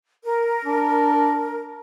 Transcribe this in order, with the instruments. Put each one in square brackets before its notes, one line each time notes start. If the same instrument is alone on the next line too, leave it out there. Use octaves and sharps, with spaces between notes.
[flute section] A#4
[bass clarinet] D4